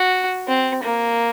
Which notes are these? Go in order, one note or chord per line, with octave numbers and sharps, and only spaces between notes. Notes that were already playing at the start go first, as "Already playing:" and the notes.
Already playing: F#4
C4
A#3